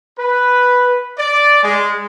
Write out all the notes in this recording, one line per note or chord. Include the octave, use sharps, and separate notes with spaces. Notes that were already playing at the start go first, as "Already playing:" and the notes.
B4
D5
G#3